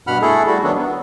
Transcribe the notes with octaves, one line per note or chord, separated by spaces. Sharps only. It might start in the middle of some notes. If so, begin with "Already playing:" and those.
G2 B2 F#5 B5 F6
A3 E4 G#4 A4
G3 E4 F#4 A4
D#3 F#3 B3 D4
B3